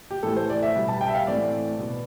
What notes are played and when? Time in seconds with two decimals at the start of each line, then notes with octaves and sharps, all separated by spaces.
0.11 G4
0.23 A2 E3 A3 A4
0.36 C5
0.50 D5
0.63 E5
0.75 B2 G3 B3
0.88 A5
1.01 G5
1.08 E5
1.15 F5
1.27 A2 E3 A3 C4 D5
1.79 B2 B3